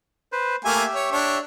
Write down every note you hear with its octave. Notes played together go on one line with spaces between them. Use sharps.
B4 C5
A3 A#3 G4 E5 G#5
C#5
D4 C#5